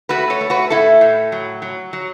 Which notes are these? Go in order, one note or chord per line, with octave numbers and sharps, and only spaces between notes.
A3 F#4 B4
A4 C#5
A3
F#4 B4
A2 E4 A4
A2
F#3
F#3
F#3